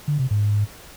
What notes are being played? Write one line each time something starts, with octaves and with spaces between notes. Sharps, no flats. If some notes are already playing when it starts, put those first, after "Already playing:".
D3
C3
G#2